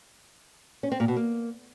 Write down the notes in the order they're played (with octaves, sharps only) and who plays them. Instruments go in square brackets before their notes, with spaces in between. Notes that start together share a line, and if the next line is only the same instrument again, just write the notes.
[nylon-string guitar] C#4
C4
A#2
B2
A#3